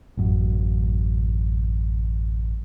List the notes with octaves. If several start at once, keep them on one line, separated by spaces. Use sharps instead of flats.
A1 F#2